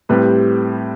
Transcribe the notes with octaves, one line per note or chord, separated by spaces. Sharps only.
A2 G3 C4 G4 B4